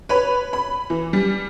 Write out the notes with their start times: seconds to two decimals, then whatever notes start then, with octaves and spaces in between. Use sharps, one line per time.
0.09 B4 C#5 B5
0.53 B5
0.90 E3
1.13 G3